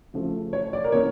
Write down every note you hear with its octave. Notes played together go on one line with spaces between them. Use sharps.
C#3 F3 A3
C#5
D5
A#4
C#3 E3 A#3 C#5